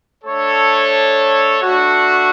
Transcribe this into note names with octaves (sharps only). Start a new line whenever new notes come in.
A3 D4 A4 C#5
A3 D4 F#4